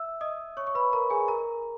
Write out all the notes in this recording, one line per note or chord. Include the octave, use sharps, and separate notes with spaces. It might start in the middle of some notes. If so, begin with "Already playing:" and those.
Already playing: E5 E6
D#5 D#6
C#5 C#6
C#6
B4 B5
A#4 A#5
G#4 G#5
A#4 A#5